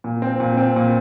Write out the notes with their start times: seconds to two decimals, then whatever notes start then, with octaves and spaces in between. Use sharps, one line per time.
0.04 A#2
0.22 C4
0.40 A#2
0.57 C4
0.76 A#2